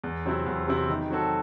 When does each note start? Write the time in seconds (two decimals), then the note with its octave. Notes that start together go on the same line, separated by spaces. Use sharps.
0.04 E2
0.25 C3 F#3 C4 E4
0.46 E2
0.68 C3 F#3 C4 E4
0.90 D#3
1.10 F#3 C4 F#4 A4